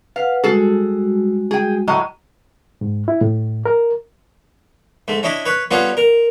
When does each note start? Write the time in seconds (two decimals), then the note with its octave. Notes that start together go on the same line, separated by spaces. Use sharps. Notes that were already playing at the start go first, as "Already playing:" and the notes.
0.16 B4 F5 F#5
0.44 G3 G#3 F#4 G#4 A4
1.51 G#4 G5
1.88 A2 F#3 D#5
2.81 G#2
3.08 E4
3.21 A2
3.66 A#4
5.08 G#2 A3
5.23 C#4 D4 E4 D#5
5.45 B4 C#5
5.71 G3 B3 C#4 F4 G#4 A4
5.97 A#4